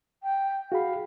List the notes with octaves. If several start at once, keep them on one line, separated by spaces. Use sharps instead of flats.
G5
F#4 G#4 F5 B5